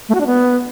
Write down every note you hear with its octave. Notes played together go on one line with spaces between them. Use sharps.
A3
F#4
D4
B3